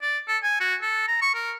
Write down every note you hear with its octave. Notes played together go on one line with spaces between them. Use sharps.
D5
A4
G#5
F#4
A4
A#5
C#6
A#4